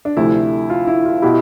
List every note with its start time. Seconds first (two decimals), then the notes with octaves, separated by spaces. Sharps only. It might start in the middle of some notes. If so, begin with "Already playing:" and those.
0.05 D4
0.17 D2 C3 F3 A3 E4
0.70 F4
0.87 E4
1.05 F4
1.22 B2 B3 E4 G4